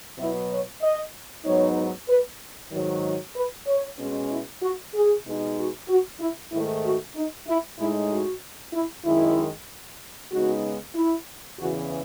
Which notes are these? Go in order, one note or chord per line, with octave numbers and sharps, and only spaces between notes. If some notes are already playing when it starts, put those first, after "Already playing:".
B2 F#3 B3 E4
C#5
D#5
G#2 F#3 B3 D#4 C#5
B4
G#2 D#3 F#3
B4
C#5
B2 G#3 C#4
E4
F#4
G#4
B2 G#3 D#4
F#4
F#4
E4
G#2 D#3 A3 E4
F#4
D#4
E4
A2 G#3 D#4 E4
F#4
E4
F#2 D#3 G#3 E4
C#3 G#3 B3 D#4 F#4
E4
E2 C#3 E3 F#4